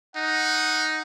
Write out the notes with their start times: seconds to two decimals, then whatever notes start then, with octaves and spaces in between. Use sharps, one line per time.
0.16 D#4 F#5